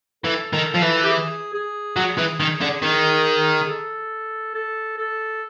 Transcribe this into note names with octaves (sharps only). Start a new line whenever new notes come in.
E3 A4
D#3
F3
E3
G4
G#4
G#4
F#3
E3
D#3
D3
D#3
A4
A4
A4